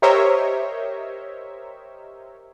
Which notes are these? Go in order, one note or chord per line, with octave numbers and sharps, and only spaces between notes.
G4 A#4 C5 C#5 D#5 E5